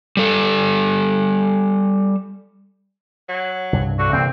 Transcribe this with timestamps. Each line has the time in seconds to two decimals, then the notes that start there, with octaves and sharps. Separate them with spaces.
0.17 G3 A4
3.29 F#3
3.73 C2 G2
3.99 D3 F#4
4.13 C3 E3 A#3 C4